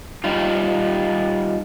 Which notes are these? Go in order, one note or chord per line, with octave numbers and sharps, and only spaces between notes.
G3 D#4 F4